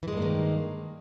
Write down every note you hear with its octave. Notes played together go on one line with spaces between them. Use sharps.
G2 D#3 E3 G#3 A#3